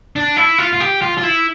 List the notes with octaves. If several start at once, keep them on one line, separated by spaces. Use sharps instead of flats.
D4
E4
F4
F4
G4
F4
F4
E4